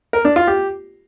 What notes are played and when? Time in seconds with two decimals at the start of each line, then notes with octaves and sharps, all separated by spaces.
0.13 A#4
0.25 D4
0.36 F4
0.47 G4